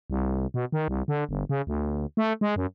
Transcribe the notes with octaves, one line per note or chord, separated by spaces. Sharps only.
C2
B2
D#3
C2
D3
G1
C#3
D2
A3
G#3
F#2